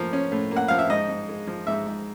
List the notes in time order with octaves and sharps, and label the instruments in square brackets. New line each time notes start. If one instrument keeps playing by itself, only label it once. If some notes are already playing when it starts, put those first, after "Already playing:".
Already playing: [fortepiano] A2 F3 A#3
C#4
A2
A#3
F#5
F3 F5
E5
G#2 D#5
G#2
G#3
F3
G#2 E5
G#2